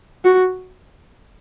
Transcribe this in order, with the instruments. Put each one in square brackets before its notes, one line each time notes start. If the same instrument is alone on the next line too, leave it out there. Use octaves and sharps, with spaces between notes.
[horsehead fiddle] F#4